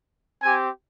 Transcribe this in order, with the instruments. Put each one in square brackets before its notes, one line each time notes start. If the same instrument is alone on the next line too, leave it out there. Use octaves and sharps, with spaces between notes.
[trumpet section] C4 G4 G#5